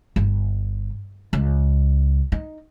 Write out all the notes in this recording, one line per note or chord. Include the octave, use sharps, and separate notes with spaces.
G1
C#2
D#4